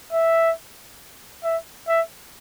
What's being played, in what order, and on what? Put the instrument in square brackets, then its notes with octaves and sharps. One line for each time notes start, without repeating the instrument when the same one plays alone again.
[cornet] E5
E5
E5